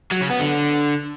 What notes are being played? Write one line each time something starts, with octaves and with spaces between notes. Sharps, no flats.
F#3
C#3
B3
D3